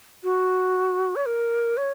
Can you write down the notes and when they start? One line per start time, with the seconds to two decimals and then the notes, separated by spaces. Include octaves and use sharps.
0.24 F#4
1.16 C#5
1.26 A#4
1.77 C#5